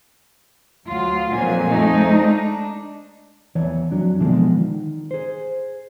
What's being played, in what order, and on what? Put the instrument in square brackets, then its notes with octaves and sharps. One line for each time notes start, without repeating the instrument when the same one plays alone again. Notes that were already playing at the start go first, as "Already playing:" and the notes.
[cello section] D2 F4 [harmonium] F#3
[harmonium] F2 F3 G#5 [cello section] A#2 F#3
[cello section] G#3 A3 D#4
[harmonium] D4
[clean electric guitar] E2 E3 C#5 D5
F2 F#3 D4
B2 D3 E3 F3 G#3 D4
D#3
G#4 C5